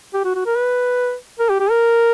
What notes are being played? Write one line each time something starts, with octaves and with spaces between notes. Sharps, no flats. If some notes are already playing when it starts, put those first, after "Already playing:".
G4
F#4
F#4
A#4
B4
A#4
G4
G4
A#4